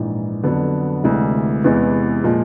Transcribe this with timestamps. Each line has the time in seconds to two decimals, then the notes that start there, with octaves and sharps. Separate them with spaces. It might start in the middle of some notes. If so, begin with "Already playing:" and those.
Already playing: A#1 G#2 E3
0.43 F2 D3 F#3 B3
1.04 D2 C3 E3 G#3
1.64 E2 C3 E3 G#3 B3
2.24 A#2 F3 G#3